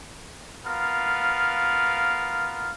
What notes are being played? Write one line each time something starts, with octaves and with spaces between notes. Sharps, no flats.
B3 F4 A#4 F5